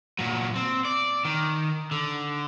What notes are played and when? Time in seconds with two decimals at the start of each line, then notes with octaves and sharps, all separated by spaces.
0.19 A#2 F#3
0.56 C4
0.85 D5
1.25 D#3
1.91 D3